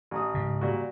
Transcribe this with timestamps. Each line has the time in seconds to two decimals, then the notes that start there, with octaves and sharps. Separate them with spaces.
0.11 A1 D#6
0.34 G#2 C#3
0.61 A#2 G3 F#4